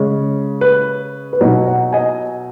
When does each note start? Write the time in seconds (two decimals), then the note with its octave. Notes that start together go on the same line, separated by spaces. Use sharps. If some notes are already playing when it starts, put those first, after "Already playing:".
Already playing: C#3 G#3 C#4
0.61 B4
1.33 B4
1.41 B2 F#3 D#4 C#5
1.67 C#5 F#5
1.93 D#5 G#5